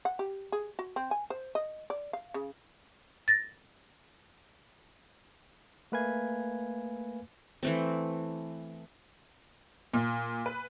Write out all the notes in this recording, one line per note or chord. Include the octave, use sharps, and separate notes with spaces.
F#5
G4
G#4
F#4
C4
G#5
C5
D#5
D5
F5
C#3
A6 A#6
A3 A#3 B4 F5 G#5 G#6
E3 A3 C4
A#2
B4